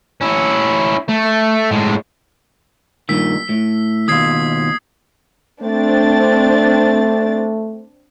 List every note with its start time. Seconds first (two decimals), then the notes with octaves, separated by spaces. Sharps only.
0.21 C#4 E4
1.09 A3
1.71 A2 G#3
3.09 G2 A#2 D#3 E6 B6
3.49 A2
4.08 D#2 B2 F4 D#6 G#6 C7
5.63 A3 C4 D4 A6